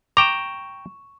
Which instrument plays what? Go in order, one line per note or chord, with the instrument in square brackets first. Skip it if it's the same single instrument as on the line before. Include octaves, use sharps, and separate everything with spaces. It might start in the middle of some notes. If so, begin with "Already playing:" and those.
[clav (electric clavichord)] G5 A#5 [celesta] C#6 E7 [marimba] D6